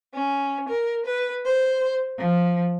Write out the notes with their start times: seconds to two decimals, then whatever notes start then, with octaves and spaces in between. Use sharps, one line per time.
0.13 C#4
0.68 A#4
1.05 B4
1.45 C5
2.17 F3